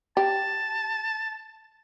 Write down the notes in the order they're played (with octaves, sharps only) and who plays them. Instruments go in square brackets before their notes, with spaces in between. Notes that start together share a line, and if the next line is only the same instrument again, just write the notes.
[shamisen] G4 [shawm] A5